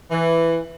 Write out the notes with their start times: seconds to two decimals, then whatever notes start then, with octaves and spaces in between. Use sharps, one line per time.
0.11 E3